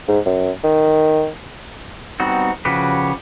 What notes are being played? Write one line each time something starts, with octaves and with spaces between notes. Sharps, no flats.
G#2
F#2
D#3
G3 B3 C4 D#4 F#4
C#3 F3 F#4 G4 B4